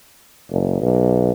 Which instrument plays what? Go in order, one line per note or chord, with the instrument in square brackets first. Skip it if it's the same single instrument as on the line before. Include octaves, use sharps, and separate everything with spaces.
[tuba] F#1
B1